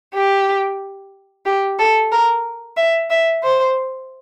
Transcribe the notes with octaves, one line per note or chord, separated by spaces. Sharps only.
G4
G4
A4
A#4
E5
E5
C5